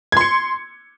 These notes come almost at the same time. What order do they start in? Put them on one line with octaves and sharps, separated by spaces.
G#6 C6 C#7